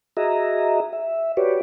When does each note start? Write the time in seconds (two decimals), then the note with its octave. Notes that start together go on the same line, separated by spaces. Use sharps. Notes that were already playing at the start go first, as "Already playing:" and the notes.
0.17 F#4 G#4 D#5 E5 A#5
0.93 E5
1.37 F#4 G4 B4 C#5 D5